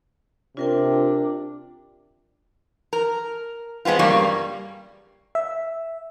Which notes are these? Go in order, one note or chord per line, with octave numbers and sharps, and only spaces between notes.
C3 D4 F4 A#4 G5
A#4
G#3 B3 C4 F4
G2 C#3 G3 A#3
E5